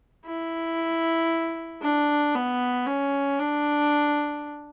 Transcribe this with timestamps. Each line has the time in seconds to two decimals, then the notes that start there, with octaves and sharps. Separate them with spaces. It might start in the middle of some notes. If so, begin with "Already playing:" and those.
0.26 E4
1.82 D4
2.34 B3
2.86 C#4
3.39 D4